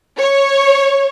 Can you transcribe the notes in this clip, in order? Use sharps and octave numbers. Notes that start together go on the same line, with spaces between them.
C#5